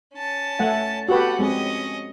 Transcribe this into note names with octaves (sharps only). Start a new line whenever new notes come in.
C#4 A5
A3 F#5 G#5
F#4 G4 A4 B4 F#5
G#3 C4 C#4 G#4 D#5